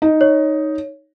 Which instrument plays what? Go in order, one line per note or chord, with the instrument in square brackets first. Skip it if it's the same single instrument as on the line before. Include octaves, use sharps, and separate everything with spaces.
[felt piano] D#4
[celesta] C#5